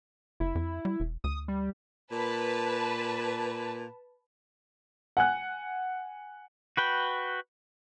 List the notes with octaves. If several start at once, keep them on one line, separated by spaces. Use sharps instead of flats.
F#1 E4
F2
G3
E1
D2 D#6
G3
A#2 B4 A5
F#5 G#5 F#6
F#4 B4 G5